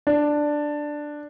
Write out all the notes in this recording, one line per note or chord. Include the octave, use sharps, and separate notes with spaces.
D4